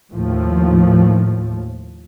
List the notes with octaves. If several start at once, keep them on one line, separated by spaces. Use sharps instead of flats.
D#2 A2 F3